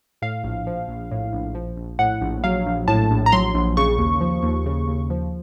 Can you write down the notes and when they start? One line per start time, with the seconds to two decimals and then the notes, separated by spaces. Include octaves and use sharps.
0.22 A2 F5
0.44 A#1
0.67 F3
0.88 A#1
1.11 A2
1.33 A#1
1.55 F3
1.77 A#1
1.99 A2 F#5
2.21 A#1
2.44 F#3 F5
2.66 A#1
2.88 A2 A5
3.10 A#1
3.26 A#5
3.32 F#3 C6
3.54 A#1
3.77 C#3 C#6
3.98 D#2
4.21 F3
4.43 D#2
4.66 C#3
4.87 D#2
5.10 F3